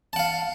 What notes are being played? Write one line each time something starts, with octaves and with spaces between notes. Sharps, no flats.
F5 F#5 A5